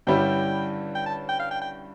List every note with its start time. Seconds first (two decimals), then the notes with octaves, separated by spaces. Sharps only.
0.07 G2 D3 G3 C#4 E4 G5
0.95 G5
1.06 A5
1.29 G5
1.40 F5
1.51 G5
1.62 G5